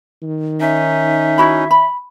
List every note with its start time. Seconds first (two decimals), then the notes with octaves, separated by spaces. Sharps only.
0.22 D#3
0.60 C#4 D#4 E5
1.38 E4 F#4 B5
1.71 B5